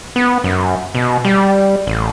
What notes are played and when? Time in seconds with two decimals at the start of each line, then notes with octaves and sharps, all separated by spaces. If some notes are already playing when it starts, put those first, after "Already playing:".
0.16 B3
0.44 F#2
0.95 B2
1.25 G3
1.87 A1